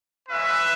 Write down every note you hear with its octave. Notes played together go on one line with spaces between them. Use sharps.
G#3 C#4 F#4 B4 E5